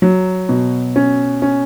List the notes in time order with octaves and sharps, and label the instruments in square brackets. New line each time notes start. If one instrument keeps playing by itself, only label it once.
[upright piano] F#3
B2
C#4
C#4